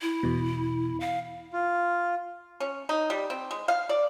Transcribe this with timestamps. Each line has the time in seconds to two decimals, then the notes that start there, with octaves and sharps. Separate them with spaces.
0.01 E4
0.23 E2 B2
1.00 F5
1.53 F4
2.60 C#4
2.89 D#4
3.10 G3
3.30 C4
3.51 G#3
3.68 F5
3.89 D5